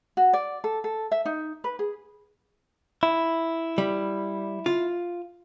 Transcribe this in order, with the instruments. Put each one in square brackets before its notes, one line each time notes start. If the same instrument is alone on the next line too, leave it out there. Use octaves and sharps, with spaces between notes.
[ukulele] F#4
D5
A4
A4
E5
D#4
B4
G#4
[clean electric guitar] E4
[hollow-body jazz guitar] G3
F4